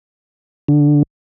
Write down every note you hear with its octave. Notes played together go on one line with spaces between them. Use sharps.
D3